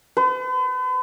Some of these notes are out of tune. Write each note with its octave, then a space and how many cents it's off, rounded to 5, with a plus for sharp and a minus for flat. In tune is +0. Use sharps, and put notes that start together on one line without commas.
B4 +45